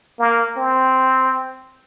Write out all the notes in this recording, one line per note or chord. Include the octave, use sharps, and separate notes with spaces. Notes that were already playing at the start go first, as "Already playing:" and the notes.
A#3
C4